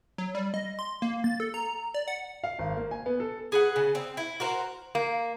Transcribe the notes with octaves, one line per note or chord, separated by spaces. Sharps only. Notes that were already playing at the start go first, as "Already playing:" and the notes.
F#3
G3
D#5
C6
A#3
A6
A4
A#5
D5
F#5
F5
G#1
A#3
G#5
B3
A4
G#4 B4 F#5
C#3
C4
E4
F#4 A#4 C5
A#3